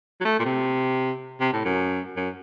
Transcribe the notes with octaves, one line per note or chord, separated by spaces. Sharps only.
F#3
A3
A#2
C3
C3
A2
F#2
F#2